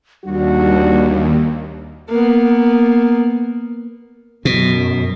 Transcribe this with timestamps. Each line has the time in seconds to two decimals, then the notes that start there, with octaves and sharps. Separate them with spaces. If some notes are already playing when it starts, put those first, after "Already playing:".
0.24 D#2 G3 D4 F#4
2.10 A#3 B3
4.45 F#2 B2